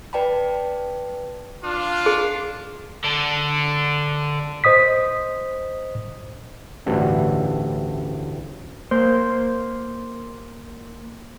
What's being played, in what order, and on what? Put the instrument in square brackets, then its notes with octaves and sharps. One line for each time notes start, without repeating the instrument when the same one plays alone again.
[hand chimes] B4 D5 G5 A5 B5
[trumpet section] D4 F4
[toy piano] G#4
[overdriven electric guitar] D3 D4
[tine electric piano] C5 D#5 D#6 B6
[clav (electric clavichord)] A1 D2 G2 E3
[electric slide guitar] A#3 C5